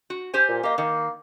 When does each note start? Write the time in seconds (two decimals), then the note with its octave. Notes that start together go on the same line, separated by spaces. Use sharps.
0.10 F#4
0.34 G4 C5 G#5
0.49 A#2
0.63 A#3 G4 D#5
0.78 D#3 A#3